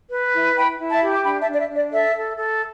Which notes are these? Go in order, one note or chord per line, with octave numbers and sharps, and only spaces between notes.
B4
E4
E4 G5 B5
E4
E5 A5
G4
D6
D4 G5 B5
E5 A5
D4
D5
E5
D4
D5
A4 E5
A4
A4